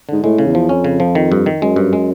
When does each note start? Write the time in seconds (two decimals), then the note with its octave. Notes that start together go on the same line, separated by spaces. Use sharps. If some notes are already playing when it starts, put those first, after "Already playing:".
0.09 G#2 D3
0.23 A2 G#3
0.38 C#3
0.46 E2
0.55 F3
0.69 F2 C#4
0.84 C#3
1.00 F3
1.15 D#3
1.32 G2
1.46 D#3
1.62 F#2 G#3
1.76 G2
1.93 G#3